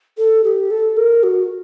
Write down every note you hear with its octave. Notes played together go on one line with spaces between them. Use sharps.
A4
G4
A4
A#4
F#4